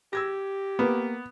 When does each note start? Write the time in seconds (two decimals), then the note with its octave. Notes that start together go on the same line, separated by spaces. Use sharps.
0.13 G4 E6 G#6 A#6
0.79 A#3 B3